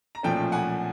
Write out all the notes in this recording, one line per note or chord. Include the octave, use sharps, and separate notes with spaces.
A#5
B1 A#2 F3 A3 C#4 G5 A5
F#5 G#5